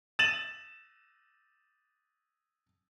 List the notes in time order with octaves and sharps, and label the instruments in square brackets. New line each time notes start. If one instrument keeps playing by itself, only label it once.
[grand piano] A6 D#7 E7 F#7